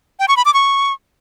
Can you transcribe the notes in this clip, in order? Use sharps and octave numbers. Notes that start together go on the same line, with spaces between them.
G5
C#6
B5
D6
C#6